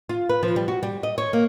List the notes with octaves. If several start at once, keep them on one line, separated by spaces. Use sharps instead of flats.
F4
B4
F3
G3
F#4
G3
D#5
C#5
A#3